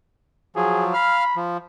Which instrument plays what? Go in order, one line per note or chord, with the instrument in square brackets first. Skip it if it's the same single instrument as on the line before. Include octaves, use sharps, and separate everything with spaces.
[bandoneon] F3 F#3 [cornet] G#4
[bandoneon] F5 F6 [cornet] B5
[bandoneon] F3